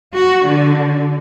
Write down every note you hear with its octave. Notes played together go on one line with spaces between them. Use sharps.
F#4
D3